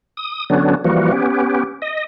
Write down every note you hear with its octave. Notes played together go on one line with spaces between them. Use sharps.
D#6
D3 F#3 B3 C#4 D4
E3 F3 G3 A#3 F#4
B3 C#4 G4
D#5